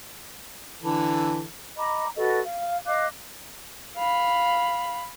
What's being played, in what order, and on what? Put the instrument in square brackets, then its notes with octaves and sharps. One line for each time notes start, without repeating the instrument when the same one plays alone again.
[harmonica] D3 E3 A4
[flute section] D#5 A#5 B5 D6
F#4 A4 B4 D#5
F5
D#5 F5 D6 F#6
[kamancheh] F5 B5